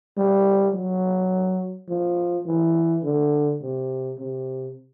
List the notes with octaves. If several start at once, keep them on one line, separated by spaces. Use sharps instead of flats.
G3
F#3
F3
E3
D3
C3
C3